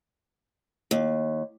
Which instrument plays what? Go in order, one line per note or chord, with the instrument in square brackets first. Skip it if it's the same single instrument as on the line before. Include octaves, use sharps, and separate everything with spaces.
[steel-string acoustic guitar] D#2